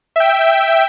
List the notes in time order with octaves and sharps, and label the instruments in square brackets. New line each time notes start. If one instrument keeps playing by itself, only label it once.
[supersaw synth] E5 G5